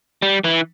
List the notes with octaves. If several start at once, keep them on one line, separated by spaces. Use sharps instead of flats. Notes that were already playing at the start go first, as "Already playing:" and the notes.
G3
E3